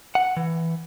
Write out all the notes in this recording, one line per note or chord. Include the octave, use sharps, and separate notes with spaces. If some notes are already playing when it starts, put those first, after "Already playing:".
F#5
E3